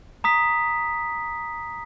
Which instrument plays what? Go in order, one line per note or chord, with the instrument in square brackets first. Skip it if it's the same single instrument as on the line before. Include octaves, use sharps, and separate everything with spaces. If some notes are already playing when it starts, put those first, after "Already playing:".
[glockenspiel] A#5 D#6 B6